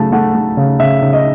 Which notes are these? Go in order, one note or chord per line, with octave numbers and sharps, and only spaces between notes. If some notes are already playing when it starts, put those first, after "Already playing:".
Already playing: C#3 F#3 A3 A5
A3 F#5
A3
C#3
C#3 E5
C#3
D#5